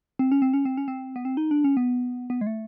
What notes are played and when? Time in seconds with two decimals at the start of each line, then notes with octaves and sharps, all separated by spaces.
0.19 C4
0.32 C#4
0.42 C4
0.54 C#4
0.65 C4
0.77 C#4
0.88 C4
1.16 B3
1.25 C4
1.37 D#4
1.51 D4
1.64 C#4
1.77 B3
2.30 B3
2.41 G#3
2.47 A3